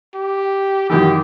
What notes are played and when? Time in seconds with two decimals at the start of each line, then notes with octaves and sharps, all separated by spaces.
0.15 G4
0.90 F#2 D#3 E3 G4